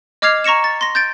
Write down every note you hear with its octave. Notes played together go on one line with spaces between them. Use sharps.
D#5 D6 F6 G#6 C7 F7
A#5 C#6 A#6 C#7 E7
A6
C6 A#6
G6 A6 D7